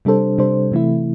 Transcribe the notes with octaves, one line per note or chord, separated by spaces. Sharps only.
C3 G3 D4 A4 C5
C3 G3 D4 A4 C5
C3 E3 A3 E4